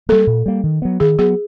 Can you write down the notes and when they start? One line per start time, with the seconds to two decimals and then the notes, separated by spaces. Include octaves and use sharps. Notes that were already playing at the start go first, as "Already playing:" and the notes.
0.09 G3 A#3 A4
0.27 A#2
0.46 G3 A#3
0.63 D#3
0.82 F#3 B3
1.00 D#3 G#4
1.19 F#3 B3 G#4